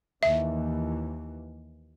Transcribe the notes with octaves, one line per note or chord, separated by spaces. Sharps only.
D#2 E3 E5